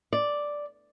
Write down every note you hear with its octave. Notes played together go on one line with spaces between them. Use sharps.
D5